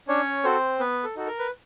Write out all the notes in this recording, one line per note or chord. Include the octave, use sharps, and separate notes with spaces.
C#4 D4 C#5
C4 F#4 A4 C5
B3 B4
A4
D#4 F#4 A4
A#4
B4